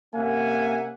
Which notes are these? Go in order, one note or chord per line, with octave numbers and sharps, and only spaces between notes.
C3 A#3 C#4 E5 F#5 G#5